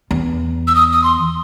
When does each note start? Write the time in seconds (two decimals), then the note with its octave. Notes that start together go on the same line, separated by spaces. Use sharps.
0.11 E2
0.67 E6
0.75 D#6
0.93 D#6
1.04 C6